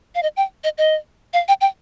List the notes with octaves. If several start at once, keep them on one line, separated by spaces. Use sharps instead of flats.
F5
D#5
G5
D#5
D#5
F5
G5
G5